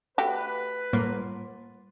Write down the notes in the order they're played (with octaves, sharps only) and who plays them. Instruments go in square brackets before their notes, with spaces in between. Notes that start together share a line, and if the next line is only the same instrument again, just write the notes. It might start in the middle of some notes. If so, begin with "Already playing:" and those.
[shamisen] A3 F#4 G4 [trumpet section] B4 [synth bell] F#6
[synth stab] A2 A#3 [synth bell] G3